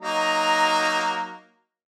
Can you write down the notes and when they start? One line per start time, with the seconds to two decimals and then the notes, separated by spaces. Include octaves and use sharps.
0.01 F#3 A#3 D#4